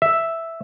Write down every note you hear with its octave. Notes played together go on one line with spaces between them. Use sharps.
E5